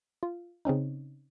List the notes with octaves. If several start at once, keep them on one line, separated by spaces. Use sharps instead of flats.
F4
C#3 C4 C#4 D#4